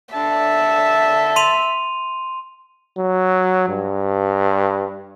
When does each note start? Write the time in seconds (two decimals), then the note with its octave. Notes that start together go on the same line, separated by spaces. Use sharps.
0.14 D3 E5 A5
1.36 C6 D#7 F7
2.98 F#3
3.68 G2